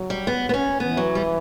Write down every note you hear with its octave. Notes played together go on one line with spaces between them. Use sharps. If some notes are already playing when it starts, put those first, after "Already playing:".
Already playing: F#3
G3
B3
B3
C#4
E3 B3
F#3
G3